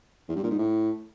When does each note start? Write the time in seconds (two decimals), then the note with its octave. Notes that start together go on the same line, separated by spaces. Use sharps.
0.28 E2
0.36 G2
0.43 A#2
0.51 G#2
0.58 A2